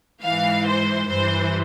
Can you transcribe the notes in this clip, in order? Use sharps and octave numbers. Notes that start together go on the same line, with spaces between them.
G#2 E3 F5
C5
G2 E3 C5